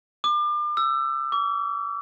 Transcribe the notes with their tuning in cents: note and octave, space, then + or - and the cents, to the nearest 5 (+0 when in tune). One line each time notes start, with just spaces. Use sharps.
D6 +35
E6 +25
D6 -40